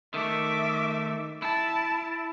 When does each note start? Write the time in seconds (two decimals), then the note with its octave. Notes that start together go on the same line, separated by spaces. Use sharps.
0.14 D#3 A3 E5 D6
1.42 E4 A5